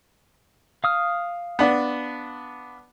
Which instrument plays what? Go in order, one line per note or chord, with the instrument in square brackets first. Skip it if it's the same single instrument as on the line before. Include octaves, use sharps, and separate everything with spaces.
[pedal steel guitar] F5 D#6 F6
[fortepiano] B3 D4